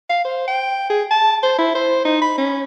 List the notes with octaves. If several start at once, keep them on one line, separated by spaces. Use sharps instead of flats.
F5
C5
G5
G#4
A5
C5
E4
C5
D#4
B5
C#4